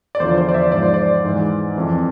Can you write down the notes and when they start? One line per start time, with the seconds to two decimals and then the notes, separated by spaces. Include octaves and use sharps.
0.15 D5
0.20 E2 D3 F3 C5
0.38 C5
0.49 D5
0.54 E5
0.72 G#2 F3 D5
0.83 C5
0.94 D5
1.24 G#2 E3
1.76 F2 E3